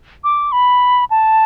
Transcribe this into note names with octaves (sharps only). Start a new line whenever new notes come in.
D6
B5
A5